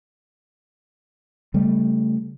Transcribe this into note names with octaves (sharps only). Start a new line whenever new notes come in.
C#3 G3 A3